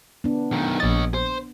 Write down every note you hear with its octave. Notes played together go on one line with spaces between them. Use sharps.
B3 D4
B1 D#3
A#1 C#5 D#5 A6
C5